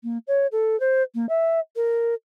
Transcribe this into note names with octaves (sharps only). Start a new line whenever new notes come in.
A#3
C#5
A4
C5
A#3
E5
A#4